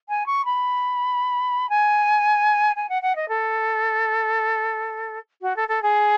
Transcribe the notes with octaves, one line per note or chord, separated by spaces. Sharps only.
G#5
C#6
B5
G#5
G#5
F#5
F#5
D#5
A4
F#4
A4
A4
G#4